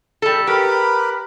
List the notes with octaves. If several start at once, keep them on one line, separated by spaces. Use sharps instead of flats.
G3 A4
G4 A#4 B4 B5